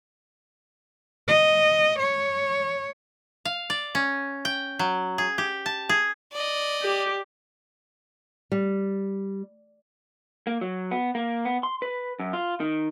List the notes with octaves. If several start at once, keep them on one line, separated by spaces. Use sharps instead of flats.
D#5
C#5
F5
D5
C#4
G5
F#3
G#4
G4
A5
G#4
D5 D#5
G4
G3
A#3
F#3
B3
A#3
B3
C6
B4
F#2
F4
D#3